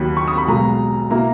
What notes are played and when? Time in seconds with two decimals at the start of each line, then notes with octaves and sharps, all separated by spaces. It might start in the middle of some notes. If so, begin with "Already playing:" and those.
Already playing: D#2 D#3 F#3 B5
0.17 C#6
0.28 D#6
0.38 B5
0.47 B1 B2 G#3 A#5
1.11 B2 A#3 E4 A#5